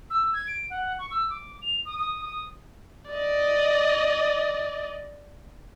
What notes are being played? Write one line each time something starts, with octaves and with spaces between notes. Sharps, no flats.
E6
G#6
D7
F#5
C#6
E6
D6
F7
D#6
D#6
D#6
D5 D#5